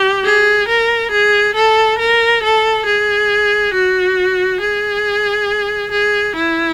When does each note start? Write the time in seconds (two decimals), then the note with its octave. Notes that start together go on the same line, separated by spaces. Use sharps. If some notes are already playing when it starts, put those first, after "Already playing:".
Already playing: G4
0.24 G#4
0.68 A#4
1.12 G#4
1.55 A4
1.99 A#4
2.43 A4
2.86 G#4
3.74 F#4
4.61 G#4
5.91 G#4
6.36 E4